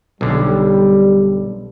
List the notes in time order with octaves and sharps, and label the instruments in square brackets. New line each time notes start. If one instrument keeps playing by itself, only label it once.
[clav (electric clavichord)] B1 D3 [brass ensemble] G3